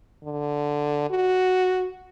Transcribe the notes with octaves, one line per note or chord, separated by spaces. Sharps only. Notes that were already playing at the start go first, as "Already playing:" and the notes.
D3
F#4